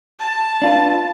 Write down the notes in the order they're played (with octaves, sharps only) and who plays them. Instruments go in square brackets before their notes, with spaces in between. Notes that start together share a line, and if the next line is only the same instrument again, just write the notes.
[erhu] A5
[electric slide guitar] D4 F4 B4